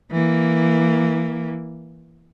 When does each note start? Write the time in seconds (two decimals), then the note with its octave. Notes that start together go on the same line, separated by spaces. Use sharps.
0.11 E3 A#3